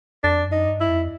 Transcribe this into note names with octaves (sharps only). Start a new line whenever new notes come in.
F2 D4
F#2
D#4
G2
E4
F2